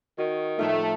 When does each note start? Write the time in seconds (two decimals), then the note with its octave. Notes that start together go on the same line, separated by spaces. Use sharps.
0.19 D#3 F#4
0.59 A2 F3 A3 D#4 F4 A4 E5